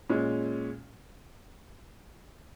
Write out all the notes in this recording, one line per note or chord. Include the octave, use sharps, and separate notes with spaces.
A#2 G#3 C#4